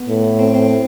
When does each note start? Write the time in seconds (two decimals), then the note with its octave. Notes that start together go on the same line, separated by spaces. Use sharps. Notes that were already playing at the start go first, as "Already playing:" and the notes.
Already playing: B3
0.08 A2
0.39 C4
0.54 C4